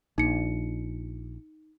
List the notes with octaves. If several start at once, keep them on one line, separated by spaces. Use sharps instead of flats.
A#1 D#4 C#7